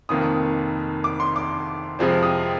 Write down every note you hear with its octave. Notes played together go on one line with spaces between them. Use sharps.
F1 F2 D#3 A#3 D#6
D6
C6
D6
F2 C3 F3 G#3 C4
D#6